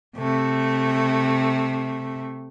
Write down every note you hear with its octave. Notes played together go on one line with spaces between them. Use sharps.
C3 A3